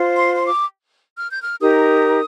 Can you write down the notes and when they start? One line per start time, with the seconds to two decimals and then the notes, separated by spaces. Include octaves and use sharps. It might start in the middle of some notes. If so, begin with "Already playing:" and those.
Already playing: F4 C5
0.17 C6
0.37 C6
0.47 D6
1.18 F6
1.31 G6
1.43 F6
1.61 D#4 G4 A#4 D#6